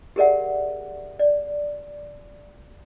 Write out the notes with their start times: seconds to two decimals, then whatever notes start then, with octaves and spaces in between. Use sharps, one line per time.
0.16 G4 G#4 A#4 D5 E5 F#5
1.19 D5